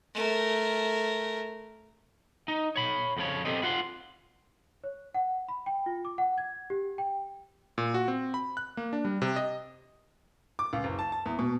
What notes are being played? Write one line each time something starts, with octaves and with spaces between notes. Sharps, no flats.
A3 A#4
D#4
C#5 B5
F2 C#3 F3 C#5
C4 G4 A4 C5 D#5
E4 F4 F#5 C6
C#5
F#5
B5
G5
F4
D6
F#5
G#6
G4
G5
A#2
F#4
C4
B5
F#6
A#3
D4
G3
C3
D#5
D6
C#2
F#1
A5
A5
E2
B2